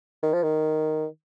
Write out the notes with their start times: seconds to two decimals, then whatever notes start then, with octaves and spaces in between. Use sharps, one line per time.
0.23 D#3
0.33 F3
0.43 D#3